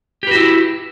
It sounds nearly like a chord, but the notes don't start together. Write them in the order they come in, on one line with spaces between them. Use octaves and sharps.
G4 B4 F#4 E4